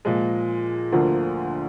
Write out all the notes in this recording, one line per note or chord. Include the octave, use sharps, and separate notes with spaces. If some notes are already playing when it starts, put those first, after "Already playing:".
A#2 F3 G#3
D2 D3 F3 A#3 F4